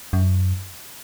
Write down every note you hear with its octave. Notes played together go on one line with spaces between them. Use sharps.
F#2